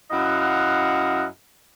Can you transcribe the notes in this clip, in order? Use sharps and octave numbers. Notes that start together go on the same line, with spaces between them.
F#2 E4 D#5 F5 F#5